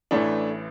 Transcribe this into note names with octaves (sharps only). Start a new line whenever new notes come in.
A1 A2 E3 A3 D4